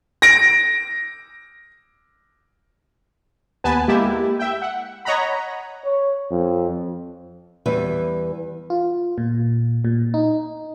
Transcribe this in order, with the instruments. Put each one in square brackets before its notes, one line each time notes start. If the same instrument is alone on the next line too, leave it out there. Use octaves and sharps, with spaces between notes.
[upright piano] A#6 D7
[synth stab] D#2 B3 B4 G#5 A5
G#3 A#3 E4 G4
E5 G5
F#5
C#5 D#5 F#5 A#5 B5
[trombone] C#5
F2
[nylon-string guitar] E2 E3 G3 B4 E5
[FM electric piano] F4
A#2
A#2
D#4